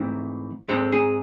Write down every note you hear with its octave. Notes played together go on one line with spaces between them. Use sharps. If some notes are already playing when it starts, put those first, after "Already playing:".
Already playing: G#2 E3 A3 C4
G#2 G#3 C4 A4
G#4